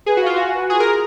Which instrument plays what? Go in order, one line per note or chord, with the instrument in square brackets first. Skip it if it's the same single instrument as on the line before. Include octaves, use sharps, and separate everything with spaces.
[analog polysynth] G#4 [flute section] B4
[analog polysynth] F#4
[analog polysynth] F4 [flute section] F5
[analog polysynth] F#4 [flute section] G#5
[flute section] B4
[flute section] F4 [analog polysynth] G#4
[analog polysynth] A#4
[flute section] G#4